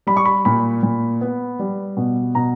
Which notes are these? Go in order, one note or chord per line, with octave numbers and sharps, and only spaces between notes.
G3 B5
C#6
B5
A#2 B5
A#2
B3
G3
B2
B2 A#5